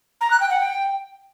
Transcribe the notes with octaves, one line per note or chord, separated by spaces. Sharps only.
A#5
F#6
G5
F#5
G5